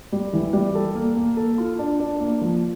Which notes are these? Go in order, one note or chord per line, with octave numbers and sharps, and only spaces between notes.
G3
E3
G3
A4
A#3
A#3
A4
F4
D4
D4
A#3
F3